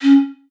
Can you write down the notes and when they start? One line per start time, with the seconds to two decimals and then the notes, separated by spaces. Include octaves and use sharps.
0.02 C#4